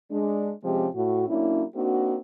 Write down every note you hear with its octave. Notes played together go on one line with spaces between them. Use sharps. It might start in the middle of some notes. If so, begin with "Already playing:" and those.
G#3 D4
C3 F3 G#3 C4 C#4 G4
A2 F#4
F#3 A#3 C#4 D4 E4
A#3 C4 D4 D#4 F#4